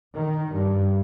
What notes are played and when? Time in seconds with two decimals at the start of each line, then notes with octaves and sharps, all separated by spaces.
0.15 D#3
0.53 G2